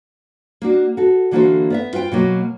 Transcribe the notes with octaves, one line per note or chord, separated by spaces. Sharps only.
A#3 D4 F#4
F#4 A4
D3 E3 A#3 F#4 A4 C5
B3 D5 E5
F4 B4 C5 G5
B2 F#3 A#3